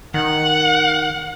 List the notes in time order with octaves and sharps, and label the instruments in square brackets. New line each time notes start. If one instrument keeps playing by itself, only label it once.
[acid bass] D#3 [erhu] F#5